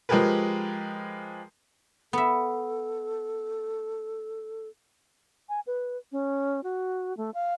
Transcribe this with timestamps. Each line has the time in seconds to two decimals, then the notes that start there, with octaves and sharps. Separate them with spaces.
0.09 F3 G#3 G4 G#4 A#4 B4
2.13 B3 A4 E5
5.49 G#5
5.67 B4
6.12 C#4
6.64 F#4
7.17 A3
7.34 F5